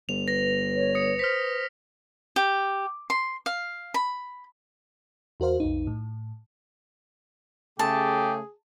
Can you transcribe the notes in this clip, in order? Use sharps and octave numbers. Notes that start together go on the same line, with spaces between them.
G1 F7
B4 A#6
C#5
D#6 C#7
C5 F6 B6
G4
C6
F5
B5
E2 F#4 A#4 C5 F5
B1 F2 D#4
A2
C#3 A3 G4 G#4 A5